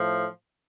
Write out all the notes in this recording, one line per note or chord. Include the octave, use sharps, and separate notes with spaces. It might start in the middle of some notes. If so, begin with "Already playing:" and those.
Already playing: A2 F3